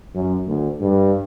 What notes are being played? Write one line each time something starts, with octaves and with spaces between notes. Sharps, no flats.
F#2
D2
G2